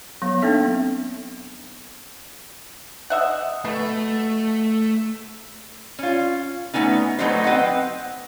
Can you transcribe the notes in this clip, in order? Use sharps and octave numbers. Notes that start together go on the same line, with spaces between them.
F#3 B3
A#3 C4 D4 D#4 A4 E5
D#5 E5 F#5
B2 A3
C#4 F4
A3 B3 C#4 D#4
F#3 A3 C4 D#4 B4 C5
C4 B4 D#5 F#5